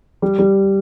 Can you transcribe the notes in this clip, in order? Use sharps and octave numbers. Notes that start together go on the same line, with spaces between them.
G3
G3